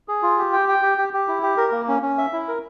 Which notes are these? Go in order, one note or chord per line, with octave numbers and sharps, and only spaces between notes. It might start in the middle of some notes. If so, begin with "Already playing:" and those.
G#4
F4
G4
G5
G5
G4
G4
G4
E4
G4
A#4
A#3
C#4
C#4
E5
E4
A#4